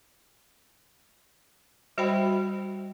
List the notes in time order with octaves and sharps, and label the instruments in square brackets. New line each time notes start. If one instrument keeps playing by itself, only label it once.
[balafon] G3 F#4 C5 D#5 G5 B5